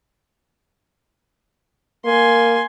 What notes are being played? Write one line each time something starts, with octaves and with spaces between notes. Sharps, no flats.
A#3 G#5 C6